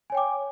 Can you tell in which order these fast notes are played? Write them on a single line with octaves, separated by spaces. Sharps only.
G#5 C#5 G5 D6